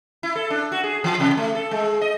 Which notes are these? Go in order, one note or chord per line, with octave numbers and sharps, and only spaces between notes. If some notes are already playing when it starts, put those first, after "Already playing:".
E4
A4
D4
F#4
G#4
E3
C3
A3
A4
G#3
D#5